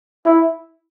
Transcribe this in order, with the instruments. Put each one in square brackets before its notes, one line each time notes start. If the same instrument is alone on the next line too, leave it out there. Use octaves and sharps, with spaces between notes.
[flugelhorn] E4